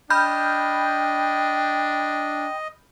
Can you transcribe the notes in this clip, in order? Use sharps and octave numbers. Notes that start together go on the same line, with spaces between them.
D4 D#5 G5 B5 F6 G6